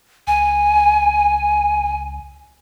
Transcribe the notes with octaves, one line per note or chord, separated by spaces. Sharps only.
C#2 G#5